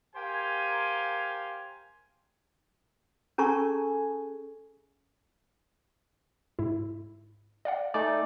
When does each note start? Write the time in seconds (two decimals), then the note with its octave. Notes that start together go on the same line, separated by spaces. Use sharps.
0.15 G4 A#4 C5 F5 G#5
3.38 C#4 G#4 A4 G#5 A#5 C#6
6.59 G#2 E4
7.65 D5 F5 F#5
7.94 A3 D#4 D5 G#5